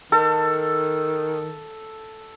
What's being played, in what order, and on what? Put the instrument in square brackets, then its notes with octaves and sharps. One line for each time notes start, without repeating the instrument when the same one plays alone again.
[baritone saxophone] D#3 [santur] A4